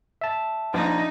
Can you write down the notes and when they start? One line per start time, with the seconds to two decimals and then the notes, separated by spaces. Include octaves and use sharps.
0.21 E5 A5
0.74 A#1 D#4